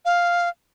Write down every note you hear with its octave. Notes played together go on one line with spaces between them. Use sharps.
F5